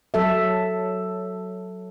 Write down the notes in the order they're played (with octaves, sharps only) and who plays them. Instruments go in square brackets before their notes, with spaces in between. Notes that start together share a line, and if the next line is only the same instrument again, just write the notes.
[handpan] F#3 A4 E5